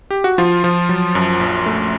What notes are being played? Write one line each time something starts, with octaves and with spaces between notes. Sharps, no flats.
G4
F#4
F3 F4
F3 F4
F#3
F#2
A#1
A3